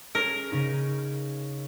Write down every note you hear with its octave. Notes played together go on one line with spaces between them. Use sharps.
C#4 G#4 A#4
C#3 C#4 D#4